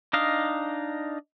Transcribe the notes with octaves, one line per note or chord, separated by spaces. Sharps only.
D4 D#4 D#5 F5